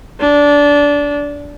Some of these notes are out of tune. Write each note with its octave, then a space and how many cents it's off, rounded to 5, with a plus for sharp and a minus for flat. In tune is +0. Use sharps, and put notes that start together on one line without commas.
D4 -20